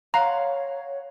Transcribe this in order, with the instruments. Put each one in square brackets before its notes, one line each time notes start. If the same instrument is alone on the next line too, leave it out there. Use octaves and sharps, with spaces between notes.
[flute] C#5 [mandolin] F5 F#5 C6 [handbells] A#5